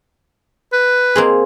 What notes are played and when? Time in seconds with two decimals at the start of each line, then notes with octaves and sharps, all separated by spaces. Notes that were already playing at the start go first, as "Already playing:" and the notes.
0.73 B4
1.15 A#3 C4 G#4